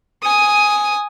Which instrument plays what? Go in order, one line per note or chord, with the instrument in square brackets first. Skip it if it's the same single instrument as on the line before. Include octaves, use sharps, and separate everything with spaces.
[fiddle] G#5 D#6